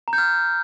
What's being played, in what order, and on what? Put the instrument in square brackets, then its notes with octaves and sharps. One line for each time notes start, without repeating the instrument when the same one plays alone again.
[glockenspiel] A#5
G6
F6